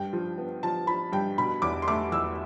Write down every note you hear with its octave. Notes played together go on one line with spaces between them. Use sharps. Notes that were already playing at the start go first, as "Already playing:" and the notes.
Already playing: G2 G5
F3
B3
F3 A5
F3 B5
G2 G5
B2 B5
E2 D6
C6
A3 D6
E2 E6